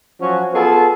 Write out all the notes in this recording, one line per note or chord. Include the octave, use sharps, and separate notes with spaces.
F3 F#3 C#4 F#4
B3 F4 G#4 A4 A5